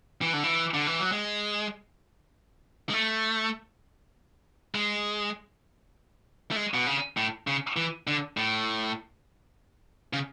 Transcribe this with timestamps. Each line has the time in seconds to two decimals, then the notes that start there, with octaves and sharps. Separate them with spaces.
0.21 E3
0.33 D3
0.44 E3
0.74 D3
0.87 E3
0.99 F#3
1.12 G#3
2.89 G#3
2.93 A3
4.75 G#3
6.51 A3
6.56 G#3
6.74 B2
6.86 C#3
7.17 A2
7.47 C#3
7.76 E3
8.07 D3
8.37 A2
10.13 C#3